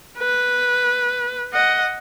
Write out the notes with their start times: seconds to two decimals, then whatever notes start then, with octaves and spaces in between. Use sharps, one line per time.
0.18 B4
1.53 D#5 F#5